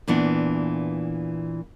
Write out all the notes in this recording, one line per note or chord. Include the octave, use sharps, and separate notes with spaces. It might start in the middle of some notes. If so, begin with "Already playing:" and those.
A#2 E3 B3 D4